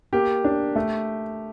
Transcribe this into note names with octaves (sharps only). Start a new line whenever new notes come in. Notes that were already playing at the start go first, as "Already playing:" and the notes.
A#3 G4
D4
A3